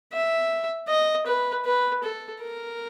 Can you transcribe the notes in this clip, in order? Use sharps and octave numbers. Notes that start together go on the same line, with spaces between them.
E5
D#5
B4
B4
A4
A#4